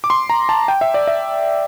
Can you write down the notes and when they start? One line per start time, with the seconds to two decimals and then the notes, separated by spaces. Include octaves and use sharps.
0.04 D6
0.10 C6
0.30 A#5
0.49 A5
0.68 G5
0.81 E5
0.94 D5
1.08 E5